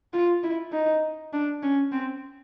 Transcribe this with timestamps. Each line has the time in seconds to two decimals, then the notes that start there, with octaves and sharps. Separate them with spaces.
0.13 F4
0.43 E4
0.73 D#4
1.33 D4
1.63 C#4
1.92 C4